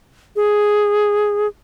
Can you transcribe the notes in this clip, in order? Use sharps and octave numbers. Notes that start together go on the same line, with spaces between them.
G#4